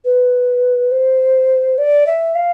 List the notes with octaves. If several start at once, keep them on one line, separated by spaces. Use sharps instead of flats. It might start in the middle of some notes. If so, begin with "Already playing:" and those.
B4
C5
D5
E5
F5